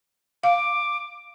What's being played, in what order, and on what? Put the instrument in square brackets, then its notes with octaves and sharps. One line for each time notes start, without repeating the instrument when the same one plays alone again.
[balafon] F5 [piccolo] D6